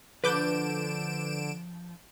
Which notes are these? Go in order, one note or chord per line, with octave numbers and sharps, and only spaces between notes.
D3 F3 D4 B4 D6 G6 D7 E7